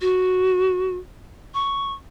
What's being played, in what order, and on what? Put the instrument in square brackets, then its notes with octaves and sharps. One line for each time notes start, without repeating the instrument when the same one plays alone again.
[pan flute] F#4
C#6